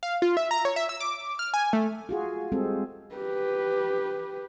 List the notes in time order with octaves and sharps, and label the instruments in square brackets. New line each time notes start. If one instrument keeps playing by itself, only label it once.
[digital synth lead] F5
F4
E5
A#5
C#5
E5
E6
D6
F6
G#5
A3
[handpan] F4 F#4 G#4
G3 G#3 C4 G#4 A4
[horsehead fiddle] G4 B4